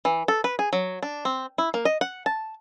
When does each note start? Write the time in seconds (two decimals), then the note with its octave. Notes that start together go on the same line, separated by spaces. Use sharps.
0.05 E3
0.28 A4
0.44 B4
0.59 G#4
0.73 F#3
1.03 D4
1.25 C4
1.58 E4
1.74 A#3
1.85 D#5
2.01 F#5
2.26 A5